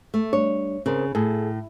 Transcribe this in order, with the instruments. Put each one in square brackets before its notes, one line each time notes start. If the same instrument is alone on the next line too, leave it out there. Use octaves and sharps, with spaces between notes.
[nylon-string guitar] A3
[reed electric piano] G3 D4 [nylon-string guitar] C#5
[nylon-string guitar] C#3 [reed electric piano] C4 A#4 C5
[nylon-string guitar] A2 [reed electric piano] G#4 A4